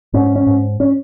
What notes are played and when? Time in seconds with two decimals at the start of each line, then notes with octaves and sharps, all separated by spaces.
0.14 G#2 C#4
0.36 C#4
0.47 G#2
0.80 C#4